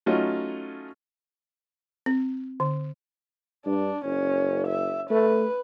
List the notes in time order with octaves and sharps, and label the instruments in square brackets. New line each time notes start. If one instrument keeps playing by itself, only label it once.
[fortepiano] F#3 A3 C#4 D#4 F4 F#4
[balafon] C4
D3
[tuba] G2 [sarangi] D4
[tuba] F#1 [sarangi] C#4
[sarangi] E5
[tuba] A3 [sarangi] B4